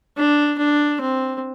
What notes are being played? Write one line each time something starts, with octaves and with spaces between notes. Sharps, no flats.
D4
D4
C4